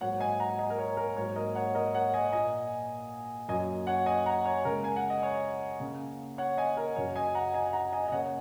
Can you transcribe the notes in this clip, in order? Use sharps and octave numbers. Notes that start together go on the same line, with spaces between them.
G#2 F#3 A#3 C#5 F#5
D#5 G#5
F#5 A#5
D#5 G#5
A#4
C#5
A#4
G#2 F#3 A#3 C#5
A#4 D#5
C#5 F#5
A#4 D#5
C#5 F#5
D#5 G#5
A#2 A#3 D#5 G#5
F#2 F#3 A#3 D#5 G#5
C#5 F#5
D#5 G#5
F#5 A#5
C#5
C#3 G#3 A#4
G#5
F#5
D#5
C#5
C#3 A#3
C#5 F#5
D#5 G#5
A#4 D#5
F#2 C#3 F#3 C#5
D#5 G#5
F#5 A#5
D#5 G#5
F#5 A#5
D#5 G#5
D#5
C#3 A#3 C#5 F#5